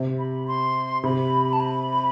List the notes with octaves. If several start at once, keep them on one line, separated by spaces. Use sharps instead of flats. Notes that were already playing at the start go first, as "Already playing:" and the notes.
Already playing: C3
B5
C6
C3 B5
A5
B5